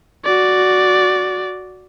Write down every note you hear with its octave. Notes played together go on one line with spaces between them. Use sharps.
F#4 D5